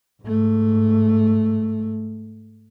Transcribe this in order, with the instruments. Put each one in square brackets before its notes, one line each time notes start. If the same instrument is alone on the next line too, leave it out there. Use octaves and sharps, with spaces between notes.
[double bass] G#2 A3